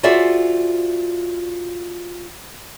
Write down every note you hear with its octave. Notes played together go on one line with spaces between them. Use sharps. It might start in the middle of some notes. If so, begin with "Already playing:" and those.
F4 F#4 G#4 C5 D5 E5